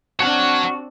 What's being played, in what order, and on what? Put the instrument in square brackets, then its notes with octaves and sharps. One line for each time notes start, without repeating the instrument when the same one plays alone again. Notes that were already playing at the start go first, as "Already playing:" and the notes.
[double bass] C4 D4 [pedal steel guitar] F#4 A5 F6 [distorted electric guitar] C#5 F#5